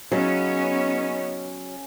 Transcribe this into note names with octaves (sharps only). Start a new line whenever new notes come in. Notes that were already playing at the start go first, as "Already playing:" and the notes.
C#3 F#3 B3 C#4 D#4